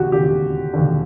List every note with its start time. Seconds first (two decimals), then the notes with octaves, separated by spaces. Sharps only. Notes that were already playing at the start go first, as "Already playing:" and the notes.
Already playing: E1 D#2 D3 F#4 G4
0.12 E1 D#2 D3 G4
0.74 E1 D#2 D3